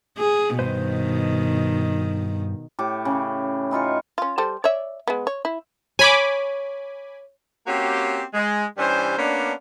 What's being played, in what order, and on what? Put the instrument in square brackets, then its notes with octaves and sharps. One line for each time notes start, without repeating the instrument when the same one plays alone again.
[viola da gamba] G#4
[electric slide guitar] G2 B4 C5 [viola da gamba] B2 D#3
[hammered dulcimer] A2 G4 C#6 D6
C#3
E3 D#4 F4 C#6
[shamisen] C#4 F4
G3 A4 C5
C#5 D5 E5
G#3 B3
C#5
E4
[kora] C#5 [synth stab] G#5 B5 D6
[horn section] A#3 C4 C#4 F#4 G4
G#3
G2 E3 G3 C#4 C5
A#3 B3 C#4 D4